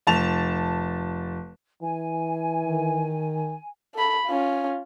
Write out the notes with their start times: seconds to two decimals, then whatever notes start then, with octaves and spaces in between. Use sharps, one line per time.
0.07 F1 A5 F7
1.82 E3 G#5
2.65 D#3
3.95 A4 B5
4.26 C#4 F4